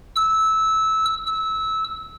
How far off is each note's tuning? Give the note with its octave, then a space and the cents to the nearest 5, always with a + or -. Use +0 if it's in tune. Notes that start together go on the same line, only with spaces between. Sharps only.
E6 -15
E6 -20